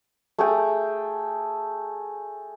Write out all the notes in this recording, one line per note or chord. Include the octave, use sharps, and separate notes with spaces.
A3 G#4 G5